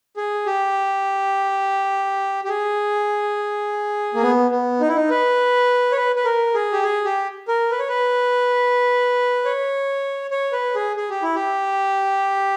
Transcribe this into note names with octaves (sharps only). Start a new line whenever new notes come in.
G#4
G4
G4
G#4
A#3
B3
B3
D#4
E4
D#4
B4
C#5
B4
B4
A#4
G#4
G4
G#4
G4
A#4
B4
C#5
B4
C#5
C#5
B4
G#4
G#4
G4
E4
G4